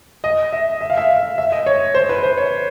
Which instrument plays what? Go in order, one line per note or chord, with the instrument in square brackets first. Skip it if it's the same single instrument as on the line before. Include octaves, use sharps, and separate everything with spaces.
[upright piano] D#5
E5
E5
F5
E5
F5
E5
D#5
C#5
C5
B4
C5
C#5